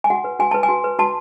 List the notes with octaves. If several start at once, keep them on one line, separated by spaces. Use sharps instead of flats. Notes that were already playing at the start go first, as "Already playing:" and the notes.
G#5
F#4 F#5
B4
F#4 G#5
B4 A5
G#5
F#4
B4
F#4 A5